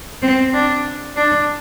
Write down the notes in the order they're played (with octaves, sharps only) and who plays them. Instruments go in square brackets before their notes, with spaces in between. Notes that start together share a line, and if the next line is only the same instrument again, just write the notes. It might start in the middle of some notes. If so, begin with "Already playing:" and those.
[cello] C4
D4
D4